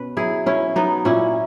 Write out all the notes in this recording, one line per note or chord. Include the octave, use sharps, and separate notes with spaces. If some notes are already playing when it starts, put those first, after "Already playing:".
Already playing: B2 B3 C#4 B4
F#3 E4 G#4
B2 C#4 E4
F#3 B3 D#4
A#2 C#4 E4